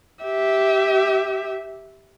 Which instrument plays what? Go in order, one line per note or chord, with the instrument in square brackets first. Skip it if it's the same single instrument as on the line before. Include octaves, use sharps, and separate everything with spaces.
[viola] G4 E5